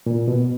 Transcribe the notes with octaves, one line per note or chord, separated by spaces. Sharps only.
A#2
B2